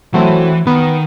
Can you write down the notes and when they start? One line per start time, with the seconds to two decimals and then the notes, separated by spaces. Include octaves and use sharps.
0.14 E3 F#3 A3 C4
0.67 D#3 B3